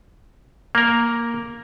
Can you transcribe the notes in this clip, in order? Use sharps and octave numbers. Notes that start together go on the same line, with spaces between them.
A#3 A#4